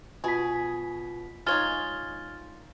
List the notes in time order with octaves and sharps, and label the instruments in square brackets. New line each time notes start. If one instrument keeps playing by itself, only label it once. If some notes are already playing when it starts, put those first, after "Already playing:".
[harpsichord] B2 [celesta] F4 B6 [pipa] G#4
[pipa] G#3 C#5 [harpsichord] D#4 F4 [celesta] F6 A6 G7